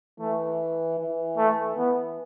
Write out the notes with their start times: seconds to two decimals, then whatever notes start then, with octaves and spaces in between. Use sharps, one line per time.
0.20 E3 A3
0.99 E3
1.38 A3
1.77 E3 B3